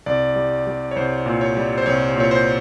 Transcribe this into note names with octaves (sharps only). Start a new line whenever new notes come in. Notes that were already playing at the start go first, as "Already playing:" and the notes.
C2 D5
G3
G3
C#5
C2 C5
A#2
C#5
G3
C5
C2 C#5
A#2 C#5
C5